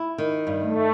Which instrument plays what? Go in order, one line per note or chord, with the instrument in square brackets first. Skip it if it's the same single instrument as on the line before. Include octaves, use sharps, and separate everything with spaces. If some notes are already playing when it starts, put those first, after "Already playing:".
Already playing: [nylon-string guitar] E4
D#3
G2
[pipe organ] A3